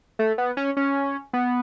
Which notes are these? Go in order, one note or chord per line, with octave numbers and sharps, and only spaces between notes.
A3
B3
C#4
C#4
B3